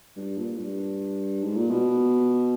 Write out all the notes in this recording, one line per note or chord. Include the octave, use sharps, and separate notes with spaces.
G2
A#2
G2
G#2
A#2
B2